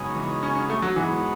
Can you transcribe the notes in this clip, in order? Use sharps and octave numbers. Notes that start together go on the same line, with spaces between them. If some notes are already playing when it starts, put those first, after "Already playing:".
Already playing: F#2 C#3 G#3 B3 D#4
E3
C#4
C#4
A3
F#3
G#2 E3 F#3 B3